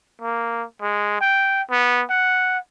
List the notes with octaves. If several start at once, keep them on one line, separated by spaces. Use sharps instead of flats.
A#3
G#3
G5
B3
F#5